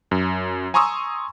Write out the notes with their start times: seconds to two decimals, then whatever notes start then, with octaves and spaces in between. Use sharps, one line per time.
0.11 F#2
0.74 G#5 A#5 C6 C#6 D#6 E6